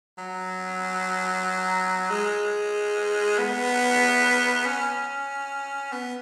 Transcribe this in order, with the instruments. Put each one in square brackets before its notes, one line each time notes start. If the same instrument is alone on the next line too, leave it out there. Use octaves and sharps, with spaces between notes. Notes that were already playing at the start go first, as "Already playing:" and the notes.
[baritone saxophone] F#3
G#3
B3
C#4
B3